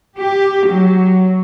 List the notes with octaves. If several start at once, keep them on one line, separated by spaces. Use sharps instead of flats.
G4
F#3